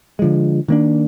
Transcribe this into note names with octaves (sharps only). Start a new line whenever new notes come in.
D3 F3 G#3
D#3 A#3 D4